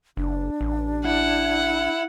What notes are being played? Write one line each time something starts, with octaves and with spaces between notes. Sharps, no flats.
F#1 D4
A1
E4 F#5